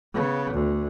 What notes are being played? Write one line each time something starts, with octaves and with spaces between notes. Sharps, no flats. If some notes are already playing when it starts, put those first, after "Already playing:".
C#3 B3
D2